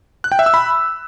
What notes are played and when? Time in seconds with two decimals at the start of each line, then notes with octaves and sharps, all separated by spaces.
0.24 F#6
0.32 G5
0.39 E5
0.46 E6
0.54 B5